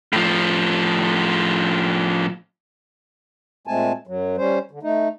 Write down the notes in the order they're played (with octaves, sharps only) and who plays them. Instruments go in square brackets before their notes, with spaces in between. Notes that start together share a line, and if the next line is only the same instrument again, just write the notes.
[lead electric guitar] A2 F3
[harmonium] A#2 G#3 A3 C4 G#5 A5
F#2 F#3
G3 C#4 C5
D3
A3 D#4